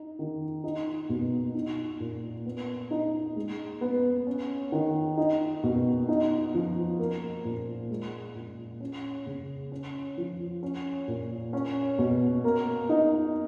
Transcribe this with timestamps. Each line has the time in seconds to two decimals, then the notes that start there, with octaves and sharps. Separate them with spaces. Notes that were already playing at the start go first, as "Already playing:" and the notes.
Already playing: D#4
0.19 D#3
0.64 D#4
1.09 B2
1.55 D#4
2.00 A#2
2.45 B3
2.91 D#4
3.36 G#3
3.81 B3
4.27 C#4
4.72 D#3
5.17 D#4
5.63 B2
6.08 D#4
6.54 F3
6.99 A#3
7.45 A#2
7.90 G#3
8.35 A#2
8.81 C#4
9.26 C#3
9.72 C#4
10.18 F3
10.63 C#4
11.08 A#2
11.53 C#4
11.98 B2
12.44 A#3
12.89 D#4